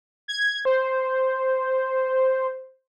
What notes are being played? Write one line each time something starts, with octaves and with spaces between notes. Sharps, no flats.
G#6
C5